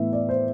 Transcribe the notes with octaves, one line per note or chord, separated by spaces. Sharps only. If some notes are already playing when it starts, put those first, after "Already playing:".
Already playing: A2 E3 B3 E5
D5
C5